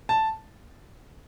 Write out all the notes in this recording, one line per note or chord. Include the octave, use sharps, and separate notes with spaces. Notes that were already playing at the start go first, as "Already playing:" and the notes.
A5